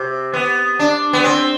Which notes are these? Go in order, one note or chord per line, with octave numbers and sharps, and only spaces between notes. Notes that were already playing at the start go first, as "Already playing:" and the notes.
Already playing: C3
B3
D4
B3
C4